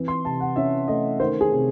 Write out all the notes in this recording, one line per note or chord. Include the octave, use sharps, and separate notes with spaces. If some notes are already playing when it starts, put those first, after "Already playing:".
Already playing: E3 C4
C6
C3 A5
F#5
C#4 E5
A3 D#5
D#3 C5
G#4
C3